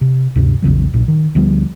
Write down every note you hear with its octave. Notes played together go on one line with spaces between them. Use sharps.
C3
D2 G2 C3
A#1 E2 C#3 F#3
B1 A#2
D#3
D2 F3 G3 B3